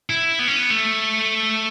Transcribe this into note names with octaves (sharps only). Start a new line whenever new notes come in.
E4
B3
C#4
B3
A3